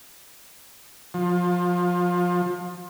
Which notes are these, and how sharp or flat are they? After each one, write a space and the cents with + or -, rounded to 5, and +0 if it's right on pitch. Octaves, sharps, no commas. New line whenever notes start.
F3 +25